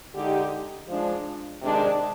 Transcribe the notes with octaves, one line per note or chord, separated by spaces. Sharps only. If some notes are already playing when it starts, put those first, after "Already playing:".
D3 G#3 D#4 G4
F3 G#3 D4
C3 D#3 G#3 D4